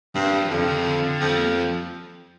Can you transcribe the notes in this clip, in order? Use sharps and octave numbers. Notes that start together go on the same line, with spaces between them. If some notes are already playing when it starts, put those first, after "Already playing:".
G2 C4
A#3
G3
F3
F2 D3
C3
D3
C3
D3
D3
F2 F3
G3
A#3
G3
F3